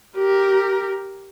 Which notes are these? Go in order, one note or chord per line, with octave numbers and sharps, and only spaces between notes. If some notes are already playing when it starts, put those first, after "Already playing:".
G4 A#4